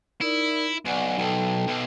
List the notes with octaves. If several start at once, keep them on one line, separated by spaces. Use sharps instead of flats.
D#4 E4 A#4 D5
B1 D5 F#5 G#5
B1 A4 G5 A5
B1